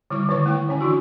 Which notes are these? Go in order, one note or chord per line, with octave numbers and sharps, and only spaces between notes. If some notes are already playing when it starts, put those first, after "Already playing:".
D3 G3 E4 D6
D3 D#3 B4 C#6
A3 E4 G5
D3 C#4 G#5
E3 D4 E4 F#4